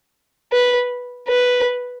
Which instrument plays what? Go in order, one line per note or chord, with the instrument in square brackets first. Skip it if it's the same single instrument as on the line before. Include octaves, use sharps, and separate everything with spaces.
[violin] B4
B4